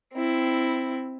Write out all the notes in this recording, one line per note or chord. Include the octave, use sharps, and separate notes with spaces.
C4 E4